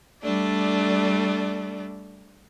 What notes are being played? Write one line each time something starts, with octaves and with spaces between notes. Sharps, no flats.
G3 A3 D4 D5